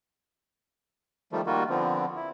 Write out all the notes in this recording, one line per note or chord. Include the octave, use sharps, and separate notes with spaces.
D#3 F3 G3 A3
D#3 G3 A#3 F4 F#4
D3 F3 B3 C4
E4